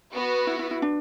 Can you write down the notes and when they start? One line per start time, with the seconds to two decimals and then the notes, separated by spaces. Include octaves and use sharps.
0.13 B3 F#4 B4
0.47 E4
0.59 E4
0.71 E4
0.82 D4